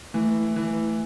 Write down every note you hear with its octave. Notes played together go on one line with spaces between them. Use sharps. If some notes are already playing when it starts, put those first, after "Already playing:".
E3 A3
E3